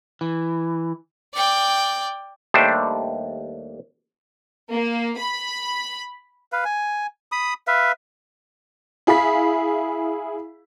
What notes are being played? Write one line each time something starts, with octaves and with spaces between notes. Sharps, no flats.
E3
D5 G5
D#2 G3 A3 D4 C5
A#3
B5
B4 F5
G#5
B5 D#6
B4 E5 F5
E4 G#4 F5 B5 B6